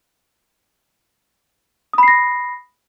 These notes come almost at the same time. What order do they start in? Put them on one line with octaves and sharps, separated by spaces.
D#6 B5 C7 A#6